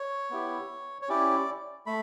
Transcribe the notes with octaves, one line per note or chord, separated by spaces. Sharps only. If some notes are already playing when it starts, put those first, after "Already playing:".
Already playing: C#5
B3 E4 G4
C#5
C#4 E4 G4 D5
A3 B5